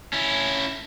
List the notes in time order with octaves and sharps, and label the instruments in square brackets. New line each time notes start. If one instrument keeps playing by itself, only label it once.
[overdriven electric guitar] C#4 E4